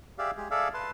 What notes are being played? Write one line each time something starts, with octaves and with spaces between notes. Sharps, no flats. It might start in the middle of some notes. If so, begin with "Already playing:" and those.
G4 G#4 D5 E5 F5
G#3 G4 G#4
G#4 A4 D5 E5 F5
B4 A5 C6